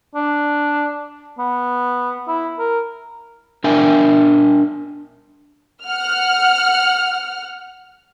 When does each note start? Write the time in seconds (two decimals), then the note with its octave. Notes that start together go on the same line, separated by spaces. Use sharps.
0.15 D4
1.38 B3
2.27 E4
2.58 A#4
3.64 D4 A#4 E5 G5 G#5
5.84 F#5 F6